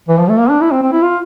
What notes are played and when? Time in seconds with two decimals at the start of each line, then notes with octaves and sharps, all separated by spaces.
0.09 E3
0.19 F3
0.30 A3
0.40 A#3
0.50 D4
0.61 E4
0.72 C4
0.82 C4
0.92 E4
1.02 F4